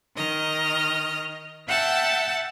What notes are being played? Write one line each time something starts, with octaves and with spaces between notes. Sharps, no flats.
D#3 D#5 F6
E5 F#5 G5 A5 E6